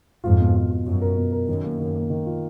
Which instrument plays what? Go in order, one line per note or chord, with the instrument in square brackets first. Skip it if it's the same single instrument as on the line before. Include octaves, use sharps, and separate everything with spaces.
[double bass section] F2 G#2 [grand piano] F4
[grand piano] B2
F4
F4
[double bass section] F#2 [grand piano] F4
[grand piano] A#4
B2
A#4
[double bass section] F#2 [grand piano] D#3
[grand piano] A#3
D#3
A#3
D#3
F4